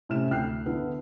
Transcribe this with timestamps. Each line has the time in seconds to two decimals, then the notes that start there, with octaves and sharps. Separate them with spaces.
0.09 A2 C3 C#4 F6 E7
0.31 D2 E4 G5 F6 F#6 C7
0.66 D3 B3 D4 E4